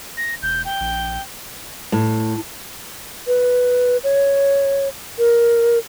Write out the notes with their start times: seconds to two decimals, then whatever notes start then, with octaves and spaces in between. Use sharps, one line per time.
0.17 A#6
0.42 E1 G6
0.65 G5
0.80 A#1
1.92 A2
3.27 B4
4.04 C#5
5.18 A#4